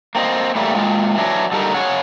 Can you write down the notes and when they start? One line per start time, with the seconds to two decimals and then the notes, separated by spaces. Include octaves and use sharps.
0.15 A#3 C4 F#4 D#5
0.55 A2 E3 G3 A#3
0.75 A#2 G#3 F4 G5
1.15 E3 F#3 D4
1.52 D3 G3 D#4 A#4
1.74 C#3 G#4 C#5 F#5